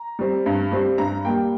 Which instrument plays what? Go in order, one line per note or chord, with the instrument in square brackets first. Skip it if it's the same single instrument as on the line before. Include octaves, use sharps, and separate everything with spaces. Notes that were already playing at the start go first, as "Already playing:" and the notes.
Already playing: [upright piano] A#5
G3 C4
G2
G3 C4
G2 A#5
G3 A#3 G5